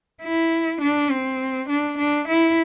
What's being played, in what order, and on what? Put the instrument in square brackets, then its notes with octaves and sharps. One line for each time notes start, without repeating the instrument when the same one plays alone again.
[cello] E4
D4
C4
D4
D4
E4